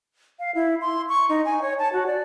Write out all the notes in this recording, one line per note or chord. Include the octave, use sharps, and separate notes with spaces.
F5
E4
C6
C#6
D#4
G#5
C#5
A5
F#4
D5